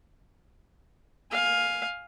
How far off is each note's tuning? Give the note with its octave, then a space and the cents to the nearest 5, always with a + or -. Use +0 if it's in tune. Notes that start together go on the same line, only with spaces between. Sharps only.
F5 +10 G#5 +0